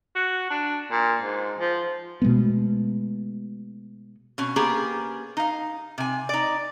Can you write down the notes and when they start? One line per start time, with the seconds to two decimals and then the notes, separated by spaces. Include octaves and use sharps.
0.16 F#4
0.50 D4
0.91 A#2
1.22 G#2
1.59 F3
2.22 B2 G#3 A3 B3
4.38 B2 C#4
4.56 A#3 B3 C#4 G4 G#4
5.37 D#4 F5
5.98 C3 G#5
6.29 D#4 D5